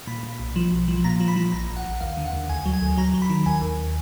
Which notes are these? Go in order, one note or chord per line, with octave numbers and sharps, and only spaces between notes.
A#2 B5
A#2
B1
F3
B1
F3
A#2 A#5
F3
B5
F3
A#1 A#5
A#1
F#5
A#1
D#2 F5
D3
F#5
D#2
D2 G#5
F#3
G#5
D2
F#3 A#5
F#3
B5
D#3
D#2 G#5
D#2